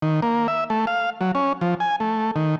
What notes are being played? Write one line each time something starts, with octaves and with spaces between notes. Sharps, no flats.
D#3
A#3
E5
A3
F5
F#3
C#4
F3
G#5
A3
D#3